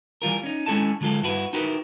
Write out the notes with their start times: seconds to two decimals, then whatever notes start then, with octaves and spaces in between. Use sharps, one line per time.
0.22 E3 G3 F4 A#4
0.43 C#4 D#4
0.66 G#3 C#4 E4 A4 D#5 A5
1.01 D3 F#3 G#3 F4 A4
1.23 G2 E4 F#4 B4
1.53 D#4 E4 F#4 G4 A#4 B4